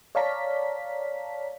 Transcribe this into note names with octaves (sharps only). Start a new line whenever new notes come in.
C#5 D5 F5 A5 A#5 B6